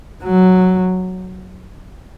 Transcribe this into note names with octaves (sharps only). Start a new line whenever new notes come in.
F#3